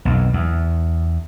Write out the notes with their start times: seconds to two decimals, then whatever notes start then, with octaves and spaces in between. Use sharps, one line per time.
0.05 B1 F2
0.33 E2